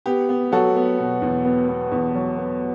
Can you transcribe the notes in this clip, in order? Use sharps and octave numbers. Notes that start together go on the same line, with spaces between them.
B3 G4
B3
F#3 F#4 A4
B3
B2
E2
B3
B3
E2
F#3
B3